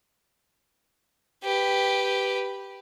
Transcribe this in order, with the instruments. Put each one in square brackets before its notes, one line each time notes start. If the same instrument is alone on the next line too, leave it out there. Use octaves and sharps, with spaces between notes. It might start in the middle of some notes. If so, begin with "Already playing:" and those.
[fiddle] G4 B4